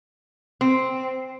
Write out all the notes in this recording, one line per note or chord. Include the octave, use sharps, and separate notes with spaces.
C4